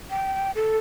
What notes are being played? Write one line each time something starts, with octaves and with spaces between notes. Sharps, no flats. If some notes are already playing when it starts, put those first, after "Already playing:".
G5
A4